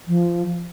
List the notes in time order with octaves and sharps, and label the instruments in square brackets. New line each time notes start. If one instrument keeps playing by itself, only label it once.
[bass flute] F3